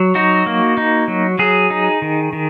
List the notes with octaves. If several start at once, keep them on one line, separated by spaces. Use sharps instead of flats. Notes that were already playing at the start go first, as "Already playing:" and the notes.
Already playing: F#3
D#4 F#4
A#3
D#4
F#3
F#3 G#4
D#4
D#3
D#3